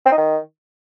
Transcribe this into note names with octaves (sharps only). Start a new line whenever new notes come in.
C4
D#4
D#3